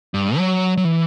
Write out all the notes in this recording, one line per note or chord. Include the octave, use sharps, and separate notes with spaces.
G2
F#3
F#3
E3